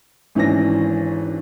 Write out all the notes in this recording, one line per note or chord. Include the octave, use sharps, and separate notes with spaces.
G#1 E3 C#4 D4 A#6